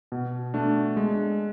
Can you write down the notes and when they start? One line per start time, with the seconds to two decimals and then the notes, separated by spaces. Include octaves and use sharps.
0.12 B2
0.54 A3 D4
0.97 G#3